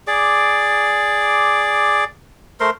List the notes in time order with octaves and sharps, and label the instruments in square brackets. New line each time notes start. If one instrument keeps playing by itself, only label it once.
[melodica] G#4 D5 D6
A3 A#4 C5 C6